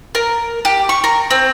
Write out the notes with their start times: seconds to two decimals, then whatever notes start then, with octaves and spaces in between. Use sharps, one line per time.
0.15 A#4
0.65 G4
0.89 C#6
1.04 A#4
1.31 C4